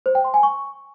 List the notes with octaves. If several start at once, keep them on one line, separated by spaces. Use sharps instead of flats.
C5
G5
C6
G#5
C#6